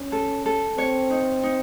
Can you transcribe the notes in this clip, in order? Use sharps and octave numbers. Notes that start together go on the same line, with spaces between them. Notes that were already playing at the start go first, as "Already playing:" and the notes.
Already playing: C#4
A4
A4
C4 C#5
D#4
D#4